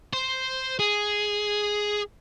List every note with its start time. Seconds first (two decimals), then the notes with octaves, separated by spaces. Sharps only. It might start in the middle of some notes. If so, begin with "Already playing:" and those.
0.13 C5
0.79 G#4